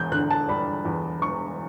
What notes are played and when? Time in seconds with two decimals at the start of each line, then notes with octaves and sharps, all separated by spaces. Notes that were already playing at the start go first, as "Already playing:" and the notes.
Already playing: E1 E2 G6
0.12 D3 F#6
0.30 A5
0.49 G3 B5
0.85 E2
1.22 E1 C#6